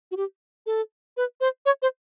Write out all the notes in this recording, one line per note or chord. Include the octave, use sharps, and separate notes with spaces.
F#4
G4
A4
B4
C5
C#5
C5